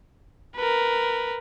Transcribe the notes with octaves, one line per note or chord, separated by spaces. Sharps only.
A#4 B4